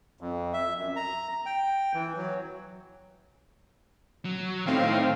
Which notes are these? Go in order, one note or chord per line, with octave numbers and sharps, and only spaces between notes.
F2
E5
F#2
A#5
G5
E3
F#3
F#3
A2 D#3 C4 D#4 F5